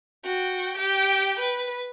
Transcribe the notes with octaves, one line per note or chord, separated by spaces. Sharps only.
F#4 G5
G4 G5
B4